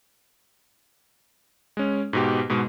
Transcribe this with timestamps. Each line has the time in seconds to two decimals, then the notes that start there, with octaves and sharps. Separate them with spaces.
1.77 G#3 C#4
2.13 G#2 B2 G4
2.49 G#2 B2 G#3